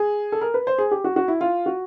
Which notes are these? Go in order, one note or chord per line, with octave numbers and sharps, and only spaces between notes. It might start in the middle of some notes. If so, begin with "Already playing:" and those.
Already playing: G#4
A4
A#4
B4
C5
G#4
G4
F#4
F#4
E4
F4
F#4